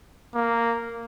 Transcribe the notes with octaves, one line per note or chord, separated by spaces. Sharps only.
A#3